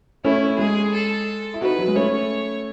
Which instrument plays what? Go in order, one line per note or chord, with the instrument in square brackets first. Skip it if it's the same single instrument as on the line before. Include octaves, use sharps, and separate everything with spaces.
[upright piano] A3 C#4 [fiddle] E4
[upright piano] G#3 [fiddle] G#4
[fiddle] A4
[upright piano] E4
[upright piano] D#4 F#4 [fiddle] B4
[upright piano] F#3
G#3
[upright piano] A3 C#4 [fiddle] C#5